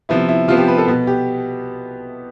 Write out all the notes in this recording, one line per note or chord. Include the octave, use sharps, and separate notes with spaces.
C3 F3 B3 E4
E4
C3 F3 B3 F4
G4
B4
A4
B2 B3
G4